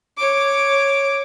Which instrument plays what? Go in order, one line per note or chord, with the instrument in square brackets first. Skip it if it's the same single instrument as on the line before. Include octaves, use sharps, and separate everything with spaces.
[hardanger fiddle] C#5 D6